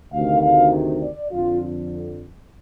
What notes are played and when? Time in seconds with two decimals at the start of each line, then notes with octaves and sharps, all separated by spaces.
0.12 D2 C3 D#3 F5
0.42 F5
1.02 D5
1.31 F2 D3 F3 F4